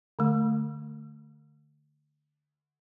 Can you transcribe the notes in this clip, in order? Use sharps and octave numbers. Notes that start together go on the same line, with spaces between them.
D3 A3